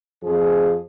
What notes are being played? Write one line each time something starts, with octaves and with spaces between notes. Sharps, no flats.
F2 F3 G#4